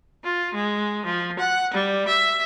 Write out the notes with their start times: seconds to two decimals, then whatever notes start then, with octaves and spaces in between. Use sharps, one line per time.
0.24 F4
0.54 G#3
1.05 F3
1.38 F#5
1.73 G3
2.07 E5